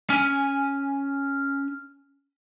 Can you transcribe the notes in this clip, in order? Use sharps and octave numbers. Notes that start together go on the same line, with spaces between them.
C#4 G#5